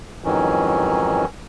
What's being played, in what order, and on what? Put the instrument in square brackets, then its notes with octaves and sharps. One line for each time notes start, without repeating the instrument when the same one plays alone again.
[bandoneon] F2 G#2 D#3 E3 F#3 C#4